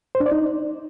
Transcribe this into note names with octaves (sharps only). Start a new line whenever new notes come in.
C5
D4
D5
D#4